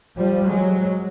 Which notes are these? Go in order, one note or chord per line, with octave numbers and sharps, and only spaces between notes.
F3 G3
F#3 G#3